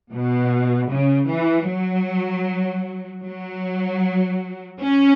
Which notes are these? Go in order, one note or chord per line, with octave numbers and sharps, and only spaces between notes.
B2
C#3
E3
F#3
F#3
C#4